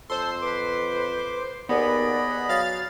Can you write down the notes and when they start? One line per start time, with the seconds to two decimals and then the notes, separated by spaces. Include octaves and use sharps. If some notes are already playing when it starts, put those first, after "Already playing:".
0.10 F2 A4 C5 C6
0.42 B4 D6
1.69 D#2 B3 G#4 D5 D#5 B5
2.49 F#3 F5 A6